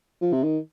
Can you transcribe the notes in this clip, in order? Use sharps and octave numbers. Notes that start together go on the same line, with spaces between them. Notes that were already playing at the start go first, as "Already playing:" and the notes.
F3
C3
D#3